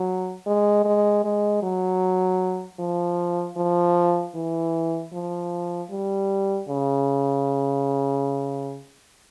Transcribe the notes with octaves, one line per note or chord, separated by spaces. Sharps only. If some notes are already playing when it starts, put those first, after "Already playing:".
Already playing: F#3
G#3
G#3
G#3
F#3
F3
F3
E3
F3
G3
C#3